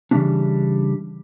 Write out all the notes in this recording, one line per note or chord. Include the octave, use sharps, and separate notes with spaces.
C#3 E3 G3 A#3 C#4 D4